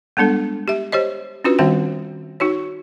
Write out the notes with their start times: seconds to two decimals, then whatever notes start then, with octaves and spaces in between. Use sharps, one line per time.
0.17 G3 G#3 B3 D4 A4
0.68 G4 E5
0.92 G4 C5 C#5 D#5
1.44 C#4 D4 F4 F#4 B4
1.59 D#3 G3 C4 F#4 E5 G5
2.40 D#4 F#4 C#5